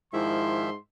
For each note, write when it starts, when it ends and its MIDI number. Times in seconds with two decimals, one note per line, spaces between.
0.13 0.75 44
0.13 0.70 51
0.13 0.70 53
0.13 0.66 64
0.13 0.70 76
0.13 0.80 84